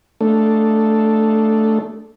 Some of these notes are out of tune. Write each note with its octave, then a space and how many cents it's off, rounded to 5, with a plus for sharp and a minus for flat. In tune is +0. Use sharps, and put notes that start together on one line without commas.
A3 +0 D4 +0 A4 +0